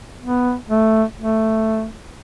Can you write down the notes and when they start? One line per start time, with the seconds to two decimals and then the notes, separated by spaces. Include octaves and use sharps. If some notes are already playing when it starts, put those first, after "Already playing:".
0.21 B3
0.69 A3
1.18 A3